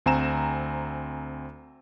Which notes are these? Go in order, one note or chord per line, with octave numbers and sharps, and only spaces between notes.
D2 C4 G#5 A#5 E7